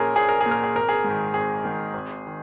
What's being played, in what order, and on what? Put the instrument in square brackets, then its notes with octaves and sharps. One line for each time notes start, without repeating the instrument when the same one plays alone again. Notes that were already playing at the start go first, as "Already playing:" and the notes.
Already playing: [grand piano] A#1 A#2 C#4 G#4 A#4
A#1 G#4
A#4
G#4
A#2
A#4
G#4
G#1 A#4
G#4
G#2
D#3
G#1 G#4
G#2 D#3
G#1
D#3